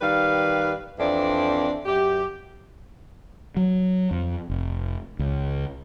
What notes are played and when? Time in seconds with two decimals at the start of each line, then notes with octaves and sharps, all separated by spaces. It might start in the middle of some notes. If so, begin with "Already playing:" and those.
0.01 D#3 G3 B4 F5
0.99 F2 E3 C4 D4 D5
1.86 F#2 G4
3.57 F#3
4.11 F2
4.50 F1
5.19 C#2